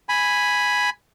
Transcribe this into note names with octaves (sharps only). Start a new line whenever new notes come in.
G#5 B5